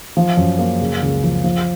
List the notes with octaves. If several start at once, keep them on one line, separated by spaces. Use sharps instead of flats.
F3
F#2
A#3
C#3
C#2
F3
F3